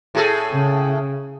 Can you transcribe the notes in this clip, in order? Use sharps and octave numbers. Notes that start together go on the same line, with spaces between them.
A2 G#4 A4
C#3